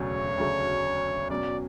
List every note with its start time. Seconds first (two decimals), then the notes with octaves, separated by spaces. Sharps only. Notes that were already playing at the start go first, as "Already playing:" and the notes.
Already playing: E1 D2 C#3 F#3 A3 C#5
0.36 E1 D2 C#3 F#3 A3
1.30 B2 F#3 C#4 D5